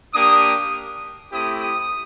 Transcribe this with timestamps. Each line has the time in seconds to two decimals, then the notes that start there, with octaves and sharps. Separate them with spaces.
0.14 A#3 D4 G4 D#6
1.32 A3 C4 E4 G4 D#6
1.61 D#6